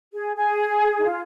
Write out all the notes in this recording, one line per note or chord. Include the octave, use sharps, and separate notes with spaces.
G#4
G#4
D#4
F4